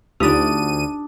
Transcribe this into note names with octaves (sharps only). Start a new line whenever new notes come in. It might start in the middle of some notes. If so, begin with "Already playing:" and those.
D2 D4 D#4 F4 G4 D#6 D#7